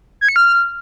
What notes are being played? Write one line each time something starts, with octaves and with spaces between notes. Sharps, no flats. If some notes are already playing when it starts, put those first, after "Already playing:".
G#6
C#7
F6